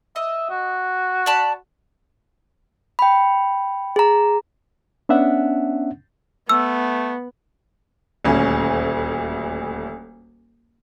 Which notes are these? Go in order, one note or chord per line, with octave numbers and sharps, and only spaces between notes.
D#5 E5
F#4
D5 A5 B5
G5 B5
G#4 A#5
B3 C#4 D4 E5 F#5
A3 B3 E6
D#1 D2 C#4